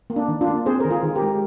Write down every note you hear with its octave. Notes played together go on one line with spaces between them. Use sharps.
A#3
D4
D#3
D4 F4
A#3
C4 G#4 C5
D#3 A#4
F4 G#4
D#3
G4 A#4
G#3